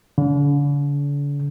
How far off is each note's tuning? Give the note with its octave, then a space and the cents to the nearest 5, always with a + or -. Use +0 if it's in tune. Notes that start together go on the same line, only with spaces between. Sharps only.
D3 -45